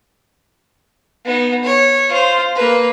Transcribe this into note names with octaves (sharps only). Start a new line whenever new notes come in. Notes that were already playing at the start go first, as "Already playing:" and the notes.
B3 D#4
C#5
F4 C5
A#3 B4